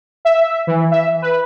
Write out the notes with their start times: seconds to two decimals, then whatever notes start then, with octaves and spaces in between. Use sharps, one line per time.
0.25 E5
0.67 E3
0.91 E5
1.22 B4